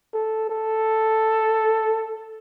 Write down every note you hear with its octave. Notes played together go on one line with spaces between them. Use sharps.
A4
A4